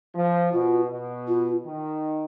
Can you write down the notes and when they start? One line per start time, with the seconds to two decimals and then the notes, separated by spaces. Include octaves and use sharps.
0.15 F3
0.53 B2 F4
0.91 B2
1.28 F4
1.65 D#3